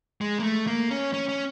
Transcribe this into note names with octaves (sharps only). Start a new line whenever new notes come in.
G#3
A#3
A3
A#3
C#4
C#4
C#4